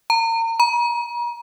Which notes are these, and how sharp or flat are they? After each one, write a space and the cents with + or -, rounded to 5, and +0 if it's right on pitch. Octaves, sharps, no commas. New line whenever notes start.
A#5 -35
A#5 +40